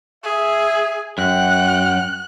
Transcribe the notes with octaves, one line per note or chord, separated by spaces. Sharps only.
G#4 E5
F#2 F#4 F#5 G5 F#6